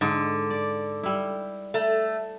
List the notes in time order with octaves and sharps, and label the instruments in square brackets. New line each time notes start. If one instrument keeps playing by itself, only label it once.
[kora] G#2 [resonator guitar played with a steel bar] D3
[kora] D5
G3 E4
[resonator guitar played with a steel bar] A3